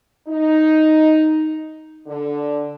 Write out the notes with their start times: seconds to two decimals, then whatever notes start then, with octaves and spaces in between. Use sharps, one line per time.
0.28 D#4
2.06 D3